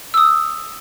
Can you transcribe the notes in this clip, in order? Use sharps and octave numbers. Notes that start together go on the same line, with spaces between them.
D#6 E6